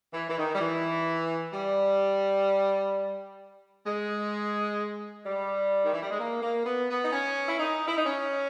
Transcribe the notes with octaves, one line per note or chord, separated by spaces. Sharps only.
E3
E3
D#3
G3
E3
G3
G#3
G3
D#3
E3
G3
G#3
A#3
A#3
B3
B3
D#4
C#4
E4
D#4
E4
D#4
C#4